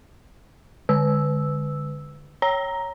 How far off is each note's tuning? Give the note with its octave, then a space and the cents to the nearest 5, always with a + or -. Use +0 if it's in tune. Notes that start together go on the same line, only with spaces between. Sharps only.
D3 +0 E6 -5
C#5 +0 A#5 +0